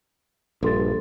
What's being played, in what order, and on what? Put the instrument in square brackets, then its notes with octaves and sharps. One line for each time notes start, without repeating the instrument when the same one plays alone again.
[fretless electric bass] A#1 [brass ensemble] G2 [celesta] A4 C6 A6